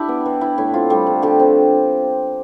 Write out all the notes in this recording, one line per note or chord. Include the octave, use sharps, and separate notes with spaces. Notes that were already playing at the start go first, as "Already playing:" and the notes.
Already playing: D4 E4 G4
B3
E3
D4 E4
A2 E4
C4 F4
G3 A3 G4
D3
D3 G4 G5
C4